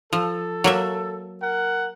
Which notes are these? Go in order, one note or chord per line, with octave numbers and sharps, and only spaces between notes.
F3 A4
F#3 A#3 E5
A#4 F#5